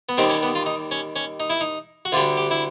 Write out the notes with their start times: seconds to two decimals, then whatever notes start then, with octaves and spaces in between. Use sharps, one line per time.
0.09 B3
0.18 D#2 D#3 G3 C4
0.30 C#4
0.43 B3
0.55 F4
0.66 D#4
0.91 C#4
1.16 C#4
1.40 D#4
1.50 E4
1.61 D#4
2.05 F#4
2.12 D2 D3 G3 F4
2.37 G4
2.51 E4